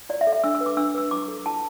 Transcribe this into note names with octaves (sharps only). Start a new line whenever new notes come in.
E4 D5
E5
A4
E5
D4 E6
E6
B4
D6
D4 E6
B4 E6
E4 D6
A4
E4 A5